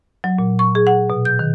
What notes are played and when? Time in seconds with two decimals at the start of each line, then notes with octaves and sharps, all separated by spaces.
0.24 F#3
0.39 A#2
0.59 C#6
0.75 G#4
0.87 F#5
1.10 B2
1.25 G6
1.39 D#3